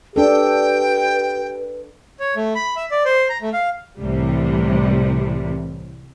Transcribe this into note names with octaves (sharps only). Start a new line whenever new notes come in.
D4 G4 A4 B4 G5
C#5
A3
B5
E5
D5
C5
A#5
A3
F5
C2 A2 C3 E3 G3